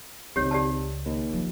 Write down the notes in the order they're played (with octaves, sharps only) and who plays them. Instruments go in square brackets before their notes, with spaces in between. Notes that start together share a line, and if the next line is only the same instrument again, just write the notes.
[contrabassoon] G#1 [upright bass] C#2 [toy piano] G4 C#5
[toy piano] G4 D5 A5
[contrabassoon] D#2
[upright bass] D#3 F3